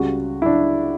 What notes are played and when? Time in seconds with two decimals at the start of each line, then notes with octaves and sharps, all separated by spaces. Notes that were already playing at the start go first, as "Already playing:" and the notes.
Already playing: C#2 C#3 G3 F#4
0.42 E4
0.46 D4